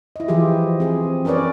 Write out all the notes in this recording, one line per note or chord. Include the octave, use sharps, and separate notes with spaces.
E4 D#5
E3 F3 F4 G4 G#4
C4 G#4
C#4 A#4 B4 C#5 D5